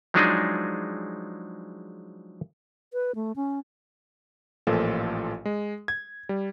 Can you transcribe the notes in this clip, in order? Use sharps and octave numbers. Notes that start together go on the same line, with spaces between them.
F3 F#3 G#3 D4 D#4 G#4
B4
A3
C#4
A1 A#2 F3 F4 A4
G#3
G#6
G3